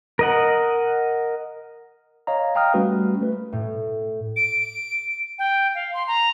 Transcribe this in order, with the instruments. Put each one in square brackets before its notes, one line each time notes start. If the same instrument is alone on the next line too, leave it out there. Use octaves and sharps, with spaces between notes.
[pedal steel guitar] A#4 D#5 F#5
[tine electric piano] C#5 D#5 F5 A#5
F5 G5 A#5 D#6 F6
G3 A3 C#4 F#4 B4
A3 B4
[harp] A2
[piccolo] D7
G5
F5
C6
A#5